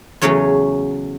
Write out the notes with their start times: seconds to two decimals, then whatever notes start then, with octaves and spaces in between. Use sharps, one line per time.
0.21 E2 C#3 F#3 A3 C#4 C#5